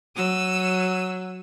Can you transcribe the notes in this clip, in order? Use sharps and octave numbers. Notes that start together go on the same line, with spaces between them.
F#3 E6 D#7